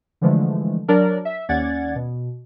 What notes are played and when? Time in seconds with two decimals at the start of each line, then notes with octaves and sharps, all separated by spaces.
0.21 D3 E3 F3 G#3 A3
0.88 F#3 D4 A#4 D5
1.25 E5
1.49 D#2 C#4 D5 F#5 G#6 A6
1.95 B2